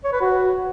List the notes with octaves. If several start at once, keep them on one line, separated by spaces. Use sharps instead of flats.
C#5
B4
F#4